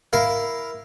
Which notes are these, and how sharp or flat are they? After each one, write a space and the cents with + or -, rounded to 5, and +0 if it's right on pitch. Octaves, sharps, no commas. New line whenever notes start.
E4 +0 A#4 +0 F5 +0